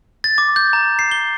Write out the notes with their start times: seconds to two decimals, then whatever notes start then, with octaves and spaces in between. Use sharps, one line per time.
0.24 A6
0.38 D6
0.56 G6
0.73 A#5
0.99 C7
1.11 G7